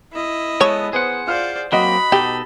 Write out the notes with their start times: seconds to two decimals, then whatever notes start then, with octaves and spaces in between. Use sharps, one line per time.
0.13 E4 D#5
0.61 G#3 B3 A4 C#5
0.93 B3 G#4 C5 F#5
1.27 F4 C5 D5 F6
1.72 F#3 A#3 C4 F#4 D#5 B5
2.12 B2 D#4 G4 A4